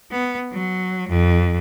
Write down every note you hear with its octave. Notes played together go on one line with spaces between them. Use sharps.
B3
F#3
F2